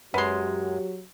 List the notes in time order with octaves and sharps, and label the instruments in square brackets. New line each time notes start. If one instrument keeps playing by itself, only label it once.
[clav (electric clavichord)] F#2 G#3 [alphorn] F#3 [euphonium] G4 [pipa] B4 C6